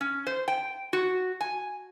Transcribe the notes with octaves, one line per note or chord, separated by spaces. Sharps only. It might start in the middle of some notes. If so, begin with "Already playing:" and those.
C#4
C5
G5
F#4
G#5